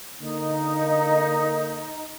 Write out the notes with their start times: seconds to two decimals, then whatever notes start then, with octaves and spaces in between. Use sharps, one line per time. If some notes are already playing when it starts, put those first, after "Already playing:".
0.21 D3 A#3 D#4